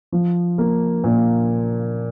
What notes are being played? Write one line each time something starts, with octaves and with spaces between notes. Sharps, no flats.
F3
A#3
A#2